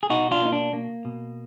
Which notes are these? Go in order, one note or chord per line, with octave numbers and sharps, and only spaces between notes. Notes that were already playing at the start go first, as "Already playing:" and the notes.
G#4
B2 D#4 F#4
D4 F4
A#3 D#4
D4
A#3
B2